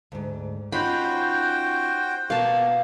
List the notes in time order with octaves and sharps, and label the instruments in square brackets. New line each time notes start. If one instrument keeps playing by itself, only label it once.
[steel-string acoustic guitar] D2 G#2
[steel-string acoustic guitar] C#4 D#4 F4 [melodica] F#4 C5 G5 [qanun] B5
[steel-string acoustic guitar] B2 B3 F#4 [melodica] A#3 [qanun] F5 A5